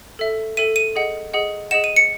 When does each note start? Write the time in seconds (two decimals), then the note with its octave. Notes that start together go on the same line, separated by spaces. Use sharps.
0.19 A4 E5
0.57 A4 E5 D#7
0.76 D#7
0.96 G#4 D#5 F#5
1.34 G#4 D#5 F#5
1.71 G#4 D#5 F#5 E7
1.84 D#7
1.96 C#7